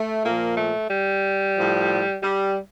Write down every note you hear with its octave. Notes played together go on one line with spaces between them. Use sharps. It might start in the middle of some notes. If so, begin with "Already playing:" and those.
Already playing: A3
A#2 F3 A#3
A3
G3
A2 F3
G3